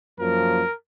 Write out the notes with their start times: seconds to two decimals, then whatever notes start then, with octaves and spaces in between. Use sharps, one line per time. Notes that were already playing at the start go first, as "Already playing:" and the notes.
0.19 F#2 F3 A#3 A#4